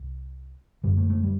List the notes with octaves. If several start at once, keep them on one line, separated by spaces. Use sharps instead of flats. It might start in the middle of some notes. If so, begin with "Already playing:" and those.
Already playing: C2
F#2 D3 G3
A3
A3
G3